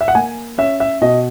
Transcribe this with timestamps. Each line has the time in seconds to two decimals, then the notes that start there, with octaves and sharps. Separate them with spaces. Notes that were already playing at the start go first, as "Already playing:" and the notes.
0.01 E5
0.08 F#5
0.15 A#3 G#5
0.58 C#4 E5
0.80 E5
1.01 B2 D#5